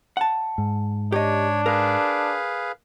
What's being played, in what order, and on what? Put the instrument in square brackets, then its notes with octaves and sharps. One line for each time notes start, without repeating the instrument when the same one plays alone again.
[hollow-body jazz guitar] F#5 A5
[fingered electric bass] G#2
[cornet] D4 [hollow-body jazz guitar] G4 D#5 [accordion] C#5
[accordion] G#4 B4 F5 [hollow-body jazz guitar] A#4